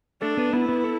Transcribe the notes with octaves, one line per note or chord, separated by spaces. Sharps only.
A3 D4 A4
B3 B4
B3 E4 B4
B3 B4
A4